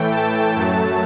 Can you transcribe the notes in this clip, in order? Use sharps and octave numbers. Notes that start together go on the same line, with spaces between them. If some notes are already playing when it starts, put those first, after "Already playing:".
Already playing: A2 E3 A3 G5
A5
F#2 F#3 A3